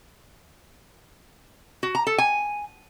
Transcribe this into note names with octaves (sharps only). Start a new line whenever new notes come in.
F#4
A#5
A4
G#5